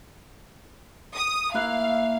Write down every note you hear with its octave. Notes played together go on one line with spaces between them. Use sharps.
D#6
A#3 E4 F5 F#5